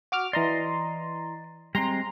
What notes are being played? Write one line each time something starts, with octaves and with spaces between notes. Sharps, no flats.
F#4 D6 F6
E3 D5 D#5 A#5 C6
G3 G#3 C4 A#5 C6